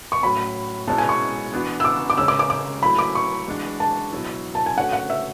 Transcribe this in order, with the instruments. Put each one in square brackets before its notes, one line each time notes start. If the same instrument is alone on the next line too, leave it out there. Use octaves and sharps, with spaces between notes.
[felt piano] C#6
[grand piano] A2 F#3 C#4 F#4 [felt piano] B5
[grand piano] B2 G#3 C#4 E4 [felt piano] A5
[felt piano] G#5
C#6
[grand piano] E3 B3 D4 F#4
[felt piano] E6
D6
D6
[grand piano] C#3 G#3 C#4 [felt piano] E6
[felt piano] D6
D6
D6
[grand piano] F#3 A3 E4 [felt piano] B5
[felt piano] D6
C#6
[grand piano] E3 G#3 D4 F#4
[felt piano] A5
[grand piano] B2 F#3 B3 E4
[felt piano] A5
G#5
[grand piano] D3 A3 C#4 F#4 [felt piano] F#5
[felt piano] F#5
E5